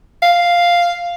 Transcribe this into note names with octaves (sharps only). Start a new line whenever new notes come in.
F5